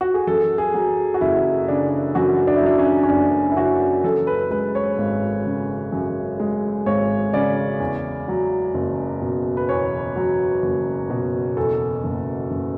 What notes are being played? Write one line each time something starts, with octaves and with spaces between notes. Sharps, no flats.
F#4
G#4
F#2 A4
G#4
F#3
F#4
F#1 E4
C#3 D4
F#2 F#4
D4
E4
F#3 D4
C#4
C#4
F#1 D4
E4
C#3 F#4
F#2 A4
B4
G#3 B4
C#5
G#1
C#3
F#2
G#3
G#1 C#5
C#3 D5
E2
F#3
F#1
B2
B4
E2 C#5
F#3
F#1
B2
E2 A4
F#1
F#1